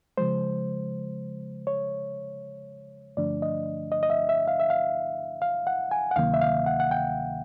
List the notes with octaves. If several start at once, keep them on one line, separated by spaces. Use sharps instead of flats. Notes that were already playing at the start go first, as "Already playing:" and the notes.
C#3 F3 G#3 C5
C#5
G2 D3 F3 A3 D4 D5
D#5
D#5
D#5
E5
E5
F5
E5
F5
F5
F#5
G#5
F#5
D2 C3 D#3 F#3 A#3 F5
E5
F5
F#5
F#5
G5